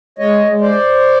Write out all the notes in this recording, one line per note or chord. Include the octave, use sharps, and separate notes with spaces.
G#3 C#5 D#5
G#3
C5 D5